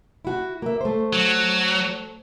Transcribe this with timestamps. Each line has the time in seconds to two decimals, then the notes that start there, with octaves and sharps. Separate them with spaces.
0.25 E4 F#4
0.62 A#3 E5
0.81 A3 C5
1.13 F#3